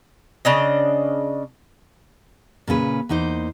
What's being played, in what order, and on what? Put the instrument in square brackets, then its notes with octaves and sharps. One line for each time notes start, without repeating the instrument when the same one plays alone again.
[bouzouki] C#3 D4 D#5
[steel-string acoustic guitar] A#2 C#3 C#4 B4
E2 A#3 D#4 C5